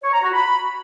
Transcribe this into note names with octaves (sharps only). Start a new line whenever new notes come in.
C#5
A#5
F#4
B5